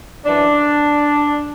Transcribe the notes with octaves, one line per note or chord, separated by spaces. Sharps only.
F#2 E3 D4